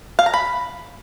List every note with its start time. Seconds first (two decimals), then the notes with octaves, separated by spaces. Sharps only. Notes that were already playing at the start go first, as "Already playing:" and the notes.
0.19 F5
0.26 A#5
0.34 B5